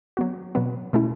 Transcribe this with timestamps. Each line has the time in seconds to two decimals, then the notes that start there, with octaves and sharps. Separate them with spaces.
0.17 F#3 B3 F#4
0.55 B2 F#3 B3
0.93 B2 A3 C#4 E4